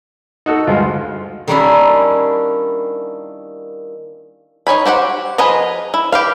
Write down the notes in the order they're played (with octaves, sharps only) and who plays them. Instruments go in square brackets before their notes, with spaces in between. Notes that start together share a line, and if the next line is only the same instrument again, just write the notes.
[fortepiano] D#4 F#4 A4
[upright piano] D2 G2 G#3 [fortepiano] F4
[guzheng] D#3 G3 A#3 C#4 D4 E4
[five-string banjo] D#4 C#5 G#5 B5
F#4 G4 C5 F#5
F3 G#4 B4 D#5 A#5
E4
G4 B4 F5